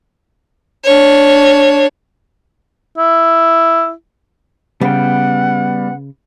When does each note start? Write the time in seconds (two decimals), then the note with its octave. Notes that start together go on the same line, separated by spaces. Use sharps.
0.84 D4 C#5
2.98 E4
4.81 C#3 G3 B3 F#5 G5